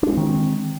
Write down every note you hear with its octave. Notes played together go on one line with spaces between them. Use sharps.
D#3 G#3 C4 D4